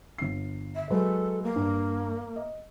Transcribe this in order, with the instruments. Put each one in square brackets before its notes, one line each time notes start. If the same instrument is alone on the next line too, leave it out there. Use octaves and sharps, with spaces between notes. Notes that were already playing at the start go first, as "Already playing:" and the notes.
[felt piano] G1 C7
[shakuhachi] E5
[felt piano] F#3 G#3 B4 [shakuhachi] A4
[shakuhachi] A#3
[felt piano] G2
D#5